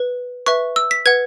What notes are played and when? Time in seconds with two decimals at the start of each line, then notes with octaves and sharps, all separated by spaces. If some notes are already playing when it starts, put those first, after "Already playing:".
Already playing: B4
0.46 B4 E5 C#6
0.76 E6
0.91 B6
1.06 B4 F#5 G#6